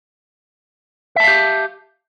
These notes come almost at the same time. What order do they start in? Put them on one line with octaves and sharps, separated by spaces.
E5 A5 F5 G4